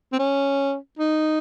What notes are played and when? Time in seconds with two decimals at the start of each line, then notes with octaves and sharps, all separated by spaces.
0.12 C4
0.19 C#4
0.99 D#4